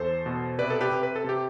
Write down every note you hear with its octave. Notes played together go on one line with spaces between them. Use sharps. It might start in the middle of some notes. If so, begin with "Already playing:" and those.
Already playing: E2 A4 C5
B2
C3 B4 D5
A4
G4 B4
C3
B4
A4
C3 G4